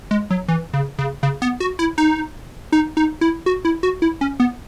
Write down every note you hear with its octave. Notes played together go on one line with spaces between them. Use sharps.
G#3
F#3
E3
C#3
C#3
C#3
B3
F#4
E4
D#4
D#4
D#4
E4
F#4
E4
F#4
E4
C#4
B3